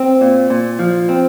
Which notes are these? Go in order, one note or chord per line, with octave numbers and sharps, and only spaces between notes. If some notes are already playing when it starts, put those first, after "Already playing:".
Already playing: C4
A#2
A#2
F3
C4